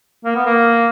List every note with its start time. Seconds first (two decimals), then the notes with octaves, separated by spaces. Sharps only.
0.25 A#3
0.35 B3
0.46 A#3